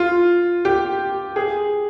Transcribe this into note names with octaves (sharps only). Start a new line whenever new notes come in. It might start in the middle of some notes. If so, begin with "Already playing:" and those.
Already playing: F4
G4
G#4